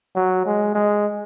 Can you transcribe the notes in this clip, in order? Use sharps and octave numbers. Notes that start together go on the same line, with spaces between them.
F#3
G#3
G#3